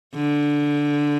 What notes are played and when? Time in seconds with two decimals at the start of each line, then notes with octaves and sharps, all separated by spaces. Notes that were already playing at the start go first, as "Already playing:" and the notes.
0.15 D3